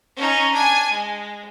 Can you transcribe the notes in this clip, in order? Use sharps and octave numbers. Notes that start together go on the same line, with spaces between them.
C#4 D#4
D4 G#5
G#3